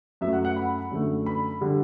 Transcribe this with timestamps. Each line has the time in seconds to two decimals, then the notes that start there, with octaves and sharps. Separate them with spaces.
0.21 F#2 F#3 A3 E5
0.33 F#5
0.45 F#5
0.56 B5
0.91 F#2 D3 F#3 A3
1.26 B5
1.61 D3 G3